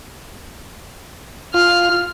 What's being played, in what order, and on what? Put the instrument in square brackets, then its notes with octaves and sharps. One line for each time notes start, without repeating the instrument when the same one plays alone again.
[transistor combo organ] F4 [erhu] F6